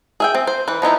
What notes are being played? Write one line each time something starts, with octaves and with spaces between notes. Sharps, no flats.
G#4 E5 G5
C4
C5
E3 B4
F3 B3 D#4 E4